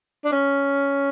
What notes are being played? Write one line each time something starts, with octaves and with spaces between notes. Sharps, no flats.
D4
C#4